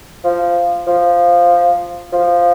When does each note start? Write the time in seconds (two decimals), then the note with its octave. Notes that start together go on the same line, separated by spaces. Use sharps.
0.24 F3
0.87 F3
2.12 F3